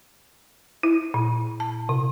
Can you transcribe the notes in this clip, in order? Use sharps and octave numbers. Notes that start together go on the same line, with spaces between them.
E4
A#2
A5
C3